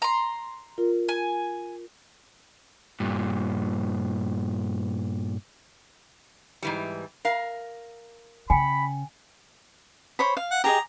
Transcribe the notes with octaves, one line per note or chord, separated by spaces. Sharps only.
A#5 C6
F4 A#4
G#5
G2 A#2
G#2 E3 G3
A#4 F5
C#3 G5 G#5 B5
C5 C#5 B5
F5
F#5
G4 G#4 D#5 A#5